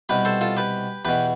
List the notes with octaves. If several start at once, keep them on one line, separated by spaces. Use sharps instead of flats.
C2 B2 G4 B4
A4 C5
F4 A4
G4 B4
E2 B2 G4 B4